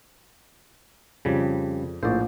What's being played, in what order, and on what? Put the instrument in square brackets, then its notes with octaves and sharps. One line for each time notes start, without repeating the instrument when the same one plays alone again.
[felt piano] F2 [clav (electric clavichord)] C#3 G3
[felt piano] A#1 A2 [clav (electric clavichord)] C5 D5